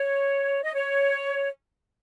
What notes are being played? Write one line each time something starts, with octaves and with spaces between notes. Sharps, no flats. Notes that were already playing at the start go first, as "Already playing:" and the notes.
Already playing: C#5
D#5
C#5